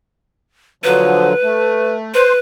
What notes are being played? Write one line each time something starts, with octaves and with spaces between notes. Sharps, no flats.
D3 F3 F#3 B4
A3
B4 C5